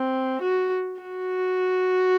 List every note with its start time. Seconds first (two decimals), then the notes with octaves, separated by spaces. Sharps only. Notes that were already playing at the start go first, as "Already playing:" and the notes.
Already playing: C4
0.42 F#4
1.01 F#4